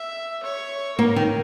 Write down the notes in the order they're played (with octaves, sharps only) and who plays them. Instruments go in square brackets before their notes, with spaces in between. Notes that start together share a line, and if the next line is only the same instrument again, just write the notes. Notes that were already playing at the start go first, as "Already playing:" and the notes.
Already playing: [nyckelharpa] E5
C#5
[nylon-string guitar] A#3 [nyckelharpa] A#4
[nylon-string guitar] D#3